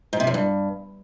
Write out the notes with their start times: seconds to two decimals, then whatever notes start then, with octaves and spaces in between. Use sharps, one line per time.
0.13 G#2
0.20 C3
0.27 F#2
0.34 G2